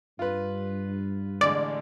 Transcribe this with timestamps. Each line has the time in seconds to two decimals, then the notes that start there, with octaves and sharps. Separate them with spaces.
0.19 G2 F4 B4
1.41 A1 D3 G#3 D5